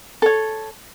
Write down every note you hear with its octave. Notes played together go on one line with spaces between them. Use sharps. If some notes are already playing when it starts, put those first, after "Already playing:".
A4 C#5